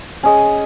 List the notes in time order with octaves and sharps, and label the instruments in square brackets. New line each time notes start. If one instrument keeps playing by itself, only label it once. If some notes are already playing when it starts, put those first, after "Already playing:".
[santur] C#4 G#4 D#5